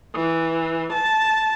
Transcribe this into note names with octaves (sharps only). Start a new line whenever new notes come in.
E3
A5